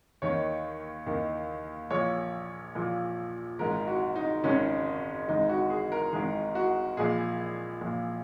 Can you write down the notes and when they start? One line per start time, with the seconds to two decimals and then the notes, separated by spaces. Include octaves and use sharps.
0.22 D#2 D#3 C#5
1.06 D#2 D#3
1.91 A#1 A#2 C#5
2.75 A#1 A#2
3.59 G#1 G#2 D#3 A#4
3.87 F#4
4.15 D#4
4.44 G#1 G#2 D#3 C#4
5.28 G#1 G#2 D#3 D#4
5.49 F#4
5.70 G#4
5.92 A#4
6.13 G#1 G#2 D#3 G#4
6.55 F#4
6.97 A#1 A#2 G#4
7.81 A#1 A#2